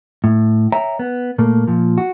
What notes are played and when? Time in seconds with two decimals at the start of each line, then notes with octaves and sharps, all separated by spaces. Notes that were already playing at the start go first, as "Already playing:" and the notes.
0.24 A2
0.72 C#5 E5 G5 A#5
0.99 B3
1.38 A#2 A3 A#3
1.67 A#2 F3
1.98 F#4